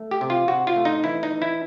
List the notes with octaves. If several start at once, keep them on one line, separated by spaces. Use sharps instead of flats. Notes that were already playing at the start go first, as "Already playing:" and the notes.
Already playing: A3
G4
C3
F4
C3 F#4
F4
A3
D#4
E3 E4
D#4
E3
E4